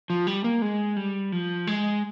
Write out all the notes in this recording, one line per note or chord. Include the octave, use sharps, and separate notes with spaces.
F3
G3
A#3
G#3
G3
F3
G#3